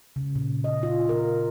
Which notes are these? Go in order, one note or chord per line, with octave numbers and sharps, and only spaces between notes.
C#3
A#2
D#5
F4
A#4